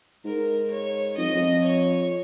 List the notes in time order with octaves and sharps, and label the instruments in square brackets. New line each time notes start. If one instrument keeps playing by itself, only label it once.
[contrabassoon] G#2 [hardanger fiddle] A#4
[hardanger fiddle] C#5
[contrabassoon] F2 [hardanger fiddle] D#5
[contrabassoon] F2
[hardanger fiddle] C#5